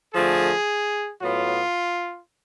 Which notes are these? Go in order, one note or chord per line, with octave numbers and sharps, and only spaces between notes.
D3 F3 A3 G#4
A2 F#3 B3 F4